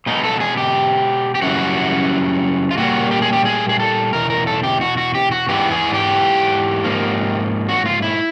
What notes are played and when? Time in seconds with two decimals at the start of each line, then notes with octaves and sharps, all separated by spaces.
0.06 B2 G#3 B3 D#4
0.24 A4
0.40 G#4
0.57 G4
1.35 G4
1.42 F#2 C#3 E3 G3 F#4
2.71 F4
2.78 A#2 G3 A#3 F#4
3.11 G4
3.22 G#4
3.33 G4
3.45 G#4
3.69 G#4
3.79 A4
4.13 E2 B2 A#4
4.30 A#4
4.47 A4
4.63 G4
4.81 F#4
4.97 F#4
5.15 G4
5.32 F#4
5.49 G#2 E3 G#3 B3 G4
5.71 G#4
5.94 G4
6.84 G#2 F3 A#3
7.69 F#4
7.86 F4
8.02 E4